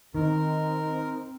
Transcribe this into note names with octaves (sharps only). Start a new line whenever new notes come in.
D#3 C4 D#4 A#4